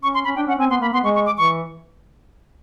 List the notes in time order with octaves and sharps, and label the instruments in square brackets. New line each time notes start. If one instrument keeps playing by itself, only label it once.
[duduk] C#4 [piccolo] C#6
[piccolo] C6
[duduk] C#4 [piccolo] B5
[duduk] D4 [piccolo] G5
[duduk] C#4 [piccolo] F#5
[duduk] C4 [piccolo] G#5
[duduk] B3 [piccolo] C6
[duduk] A#3 [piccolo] B5
[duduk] B3 [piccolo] C6
[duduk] G#3 [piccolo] C#6
[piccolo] C#6
D6
[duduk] E3 [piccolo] C#6